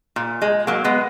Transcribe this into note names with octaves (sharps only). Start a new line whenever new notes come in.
A#2
G#3
F#3 A#3
G#3 B3